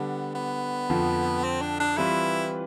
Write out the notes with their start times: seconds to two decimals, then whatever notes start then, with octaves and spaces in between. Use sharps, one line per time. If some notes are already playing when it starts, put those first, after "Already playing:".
Already playing: D3 G3 B3 D4
0.35 B3
0.90 F2 D3 F3
1.44 C4
1.61 D4
1.80 D4
1.97 E3 G3 C4 E4 F4 B4